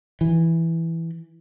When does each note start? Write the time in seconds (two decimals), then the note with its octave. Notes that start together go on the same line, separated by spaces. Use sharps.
0.21 E3